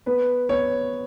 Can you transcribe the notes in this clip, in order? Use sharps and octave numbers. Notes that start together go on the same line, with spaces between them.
B3 B4
B3 C#5